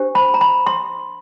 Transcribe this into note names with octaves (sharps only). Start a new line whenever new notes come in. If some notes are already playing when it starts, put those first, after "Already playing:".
Already playing: D4 G4 C5
B5
A#5
B5
C6